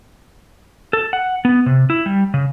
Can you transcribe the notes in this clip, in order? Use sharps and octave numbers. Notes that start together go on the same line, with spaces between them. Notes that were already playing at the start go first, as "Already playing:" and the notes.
A4
F#5
B3
C3
E4
G3
C#3